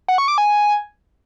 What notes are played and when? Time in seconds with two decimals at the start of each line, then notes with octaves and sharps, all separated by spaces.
0.08 F#5
0.18 C#6
0.28 D6
0.38 G#5